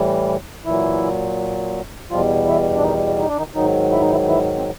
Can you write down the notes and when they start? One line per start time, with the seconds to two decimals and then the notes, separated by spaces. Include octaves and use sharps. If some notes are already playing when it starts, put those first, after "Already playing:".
Already playing: A2 E3 G3
0.65 A#2 E3 F#3 E4
2.11 E2 B2 F3 G3 F4
2.47 E3 E4
2.76 D4
2.83 D#3 D#4
3.19 D#4
3.28 D4
3.38 D#3 D#4
3.55 G#2 D#3 F#3 D#4
3.91 E4
4.01 D#4
4.11 E3 E4
4.27 E3 E4
4.56 C4